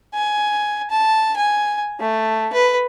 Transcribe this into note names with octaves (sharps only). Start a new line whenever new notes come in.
G#5
A5
G#5
A3
B4